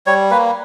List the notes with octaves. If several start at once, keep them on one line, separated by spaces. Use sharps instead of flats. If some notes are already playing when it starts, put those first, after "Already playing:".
G3 C#5
A#3 B4